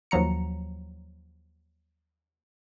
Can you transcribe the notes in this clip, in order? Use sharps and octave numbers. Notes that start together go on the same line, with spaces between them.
D#2 F3 F#3 A#5 C#7